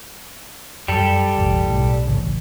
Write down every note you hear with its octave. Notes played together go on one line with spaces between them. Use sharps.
F#2 G3 A4
E1 A1
B1 A2
D1 A1 C#3